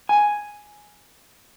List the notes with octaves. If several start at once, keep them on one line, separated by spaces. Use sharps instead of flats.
G#5